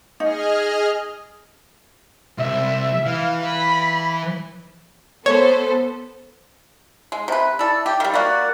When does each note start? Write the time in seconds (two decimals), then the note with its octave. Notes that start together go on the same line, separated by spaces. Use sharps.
0.20 D#4 G#4 D#5 F6
2.38 C2 E5
3.06 E3 F5
3.43 B5
5.26 B3 A4 C5 C#5
7.12 G#3
7.28 C3 B4
7.59 E4 A4 D5
7.86 G4
8.00 D#3 G3 E5 F5
8.14 A#3 F#4 A#4 D5 F#5